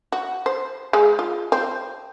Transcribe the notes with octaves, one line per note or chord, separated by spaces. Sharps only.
F#4
C5
G#3
F4
C4